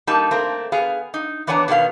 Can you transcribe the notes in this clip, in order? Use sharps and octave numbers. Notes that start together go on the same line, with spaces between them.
G3 A#3 D#4 A5
A3 A#3 C4
B3 G#4 F5
D#4
E3 B3 D4 C#5 F#5 A#5
B2 D#3 B3 F5